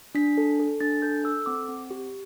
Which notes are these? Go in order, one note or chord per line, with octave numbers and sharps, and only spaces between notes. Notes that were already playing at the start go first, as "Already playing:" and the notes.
D4 B6
A4
A4
D4 A6
A4 G6
A4 E6
C4 D6
C4
G4